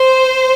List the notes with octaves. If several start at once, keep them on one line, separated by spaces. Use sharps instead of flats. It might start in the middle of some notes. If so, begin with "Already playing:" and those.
Already playing: C5